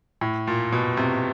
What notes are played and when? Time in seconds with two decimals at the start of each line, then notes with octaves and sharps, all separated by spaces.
0.21 A2
0.47 A#2
0.72 B2
0.97 C3